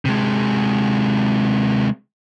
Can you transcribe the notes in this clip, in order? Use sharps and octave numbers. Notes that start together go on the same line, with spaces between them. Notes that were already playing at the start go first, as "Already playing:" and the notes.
C3 G#3